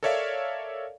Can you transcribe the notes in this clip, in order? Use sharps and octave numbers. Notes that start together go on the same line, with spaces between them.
A4 A#4 C#5 D5 E5 F5